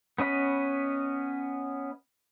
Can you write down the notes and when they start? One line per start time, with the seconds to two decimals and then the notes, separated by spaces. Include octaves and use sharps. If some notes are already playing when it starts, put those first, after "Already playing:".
0.18 B3 C#4 D#5 B5